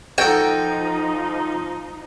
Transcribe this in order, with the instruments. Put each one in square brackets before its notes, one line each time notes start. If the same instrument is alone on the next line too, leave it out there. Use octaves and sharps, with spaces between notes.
[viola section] F3 D#4 [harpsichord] F#4 A4 [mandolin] G5